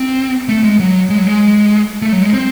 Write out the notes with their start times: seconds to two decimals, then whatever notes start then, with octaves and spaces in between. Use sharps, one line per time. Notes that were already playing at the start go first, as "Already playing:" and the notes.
Already playing: C4
0.49 A3
0.64 G#3
0.79 F#3
1.10 G#3
1.18 F#3
1.27 G#3
2.02 A3
2.12 F#3
2.23 G#3
2.33 C4